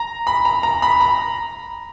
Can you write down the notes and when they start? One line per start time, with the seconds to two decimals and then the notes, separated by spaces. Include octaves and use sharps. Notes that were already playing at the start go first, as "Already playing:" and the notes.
Already playing: A#5
0.27 B5
0.45 A#5
0.63 A#5
0.82 B5
1.00 A#5